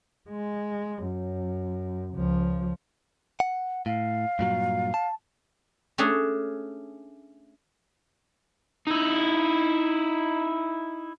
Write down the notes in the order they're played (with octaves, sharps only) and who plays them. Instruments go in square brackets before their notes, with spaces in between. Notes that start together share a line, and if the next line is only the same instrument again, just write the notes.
[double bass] G#3
F#2
C#2 F3
[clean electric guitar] F#5
[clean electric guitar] A2 [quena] F5
[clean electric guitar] G2 A#2 F#3
A5
[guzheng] A3 C#4 D4 G#4
[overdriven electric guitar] D#4 E4